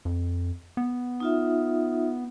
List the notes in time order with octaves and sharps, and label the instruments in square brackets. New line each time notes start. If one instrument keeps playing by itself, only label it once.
[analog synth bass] F2
B3
[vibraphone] D#4 F4 E5